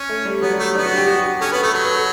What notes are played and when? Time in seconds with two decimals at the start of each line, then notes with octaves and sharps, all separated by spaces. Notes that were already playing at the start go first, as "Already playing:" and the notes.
Already playing: C#4
0.09 A3
0.25 G3
0.42 F#3 B3
0.53 G3
0.59 A3
0.75 B3 D4
0.86 F#4
0.97 G4
1.08 F#4
1.16 G4
1.41 C#4 A4
1.52 B3 B4
1.62 A3 A4
1.74 F#3 A4
1.85 B4
1.96 A4